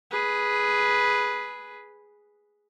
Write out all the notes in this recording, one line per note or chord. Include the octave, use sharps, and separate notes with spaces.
G#4 B4